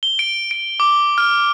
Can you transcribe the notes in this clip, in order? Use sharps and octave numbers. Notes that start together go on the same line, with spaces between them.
G7
D7
D7
D6
F6